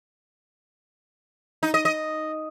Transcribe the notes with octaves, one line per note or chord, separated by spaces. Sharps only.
D#4
D#5
D#5